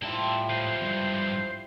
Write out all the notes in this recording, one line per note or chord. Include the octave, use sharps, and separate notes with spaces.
A2 G3 A#3 E4 F4 E5 A5
G#2 F3 C5
E2 G2